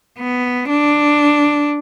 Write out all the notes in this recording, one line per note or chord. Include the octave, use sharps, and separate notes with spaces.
B3
D4